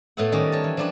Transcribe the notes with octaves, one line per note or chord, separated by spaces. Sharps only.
A2 A3 B3 B4 E5 F#5
D#3 G3 C#4 D5 D#5
A#4 C#5 A5
E3
F3 G3 D4 G4 B4